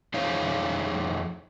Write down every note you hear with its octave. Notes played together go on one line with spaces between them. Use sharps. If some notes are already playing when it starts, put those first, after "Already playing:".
F2 D#4 G#4 C5 C#5 F5